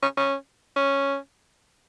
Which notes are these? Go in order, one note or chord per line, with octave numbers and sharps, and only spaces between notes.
C#4
C#4
C#4